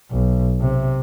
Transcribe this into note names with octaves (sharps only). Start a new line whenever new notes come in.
B1
C3